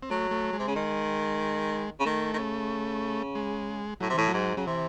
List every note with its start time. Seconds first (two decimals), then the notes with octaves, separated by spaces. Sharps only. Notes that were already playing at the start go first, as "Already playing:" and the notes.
0.03 C4
0.10 F#3 A3
0.31 A3
0.53 G#3
0.59 C3
0.68 C#3
0.75 D#3
2.00 C#3
2.05 D#3 A3
2.34 D#3
2.38 C#3
3.35 G#3
4.01 A2 F#3
4.10 C3
4.14 A2 E3
4.27 F#3
4.34 G#2
4.57 C#3 F#3
4.67 C3 E3